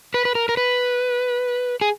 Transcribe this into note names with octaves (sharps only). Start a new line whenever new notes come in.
B4
B4
A#4
A#4
B4
G#4